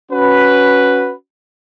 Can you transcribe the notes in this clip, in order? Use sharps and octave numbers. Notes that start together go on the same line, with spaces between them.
C#4 F#4 B4